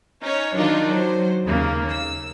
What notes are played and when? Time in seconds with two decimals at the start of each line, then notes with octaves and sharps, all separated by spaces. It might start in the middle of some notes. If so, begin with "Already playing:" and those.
0.23 C#4 D#4 C#5
0.56 D#3 F#3 D4 D#4 F4
0.91 F#3 C5
1.44 D#2 C#3 A#3
1.89 E6